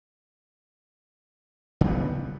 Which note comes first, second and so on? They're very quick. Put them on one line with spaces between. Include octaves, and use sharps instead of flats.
C#3 G3 B3